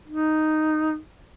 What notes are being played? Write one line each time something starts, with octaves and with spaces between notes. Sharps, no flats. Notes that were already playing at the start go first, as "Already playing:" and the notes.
D#4